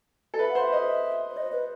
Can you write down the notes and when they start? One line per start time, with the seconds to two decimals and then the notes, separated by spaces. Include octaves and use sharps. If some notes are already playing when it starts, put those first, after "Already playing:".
0.34 A4
0.39 B4 E5
0.50 C5 F#5
0.61 E5
0.72 D#5
1.30 C5
1.37 D#5
1.52 B4